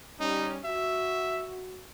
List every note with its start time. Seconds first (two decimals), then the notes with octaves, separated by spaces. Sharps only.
0.20 G3 C#4 D#4
0.65 F#4 E5